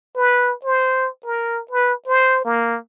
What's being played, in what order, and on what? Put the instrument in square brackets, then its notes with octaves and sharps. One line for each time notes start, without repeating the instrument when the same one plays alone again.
[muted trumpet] B4
C5
A#4
B4
C5
A#3